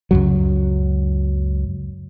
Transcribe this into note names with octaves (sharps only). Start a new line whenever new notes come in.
C#2 F#2 F#3